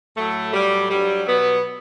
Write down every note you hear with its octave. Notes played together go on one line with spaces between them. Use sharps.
A2 F#3 A3
A2 F#3 G3
G2 F#3 G3
B2 F#3 B3